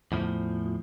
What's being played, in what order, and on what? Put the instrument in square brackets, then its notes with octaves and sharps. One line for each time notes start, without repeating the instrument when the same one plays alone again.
[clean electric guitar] E2 A2 F3